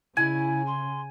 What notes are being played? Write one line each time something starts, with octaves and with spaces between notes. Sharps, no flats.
C#3 E4 G#5
C6